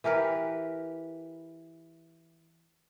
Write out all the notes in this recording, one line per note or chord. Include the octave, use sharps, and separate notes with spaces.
E3 G4 A#4 B4